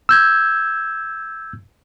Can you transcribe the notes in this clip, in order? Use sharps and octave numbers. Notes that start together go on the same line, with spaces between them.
E6 G6 G#6